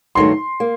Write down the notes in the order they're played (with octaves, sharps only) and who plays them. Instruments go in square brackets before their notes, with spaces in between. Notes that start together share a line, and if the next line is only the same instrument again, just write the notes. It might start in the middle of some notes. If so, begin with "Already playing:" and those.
[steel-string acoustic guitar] G2 D#3 F#3 A3 [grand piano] C6
[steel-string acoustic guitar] A#3